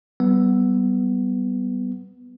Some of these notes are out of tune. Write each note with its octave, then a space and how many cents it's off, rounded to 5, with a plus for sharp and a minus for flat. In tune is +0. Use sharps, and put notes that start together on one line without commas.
G3 -30 B3 +0